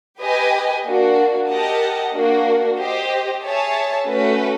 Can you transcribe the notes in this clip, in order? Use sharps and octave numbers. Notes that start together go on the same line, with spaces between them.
G4 B4 D#5 G#5
A#3 D4 F#4
G4 A#4 D#5 F#5 A5
A#3 D4 F#4
G4 C5 D#5
G#4 C#5 E5 A5
A3 C#4 F#4 B4